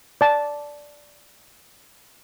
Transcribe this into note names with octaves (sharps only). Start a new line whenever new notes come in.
D5 A5